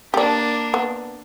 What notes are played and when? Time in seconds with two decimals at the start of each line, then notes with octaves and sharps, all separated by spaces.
0.14 A#3 D4 G4 D5
0.74 B3